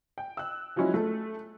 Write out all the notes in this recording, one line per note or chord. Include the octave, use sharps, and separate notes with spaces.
G5
E6 F#6
F3 F#3 G#3 C#4 E4
A3 A4